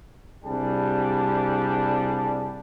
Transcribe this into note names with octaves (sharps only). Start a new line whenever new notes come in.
C2 G3 D4 G#4 A5